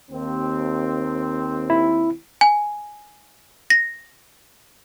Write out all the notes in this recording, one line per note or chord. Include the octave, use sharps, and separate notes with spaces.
D#2 C4
E4
G#5
A#6